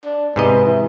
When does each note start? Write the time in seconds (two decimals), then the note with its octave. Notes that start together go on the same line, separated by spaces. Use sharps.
0.05 D4
0.36 G#2 C3 B3 D#5
0.66 E3